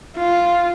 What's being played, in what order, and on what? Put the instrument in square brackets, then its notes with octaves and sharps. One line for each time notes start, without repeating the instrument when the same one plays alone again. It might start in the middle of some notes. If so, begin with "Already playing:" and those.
[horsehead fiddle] F4